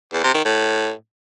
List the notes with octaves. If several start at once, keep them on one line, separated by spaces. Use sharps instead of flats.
E2
C3
D#3
A2